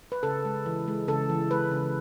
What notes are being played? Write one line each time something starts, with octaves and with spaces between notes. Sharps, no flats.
B4
C#3 A4
G#3
E3
G#3
C#3 A4
E3
G#3 B4
C#3